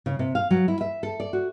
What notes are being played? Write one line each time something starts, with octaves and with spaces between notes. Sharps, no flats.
C#3
C3
F5
F#3
E4
E5
A4
D5
F#4